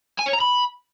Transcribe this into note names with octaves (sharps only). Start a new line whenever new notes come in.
G#5
C#5
A#5
B5